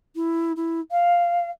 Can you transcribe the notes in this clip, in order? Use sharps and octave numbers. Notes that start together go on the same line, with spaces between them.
E4
E4
F5